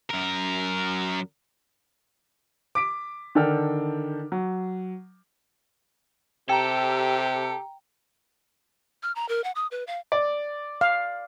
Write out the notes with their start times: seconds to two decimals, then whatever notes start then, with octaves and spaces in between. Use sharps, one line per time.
0.10 F#2 A#4
2.75 D6 B6 D7
3.35 D3 D#3 A4 D5 G5 F6
4.32 F#3
6.49 C3 G4 A4 G5 A#5
9.03 F6
9.16 A#5
9.29 A#4
9.44 F#5
9.55 D#6
9.71 B4
9.87 F5
10.12 D5
10.81 F5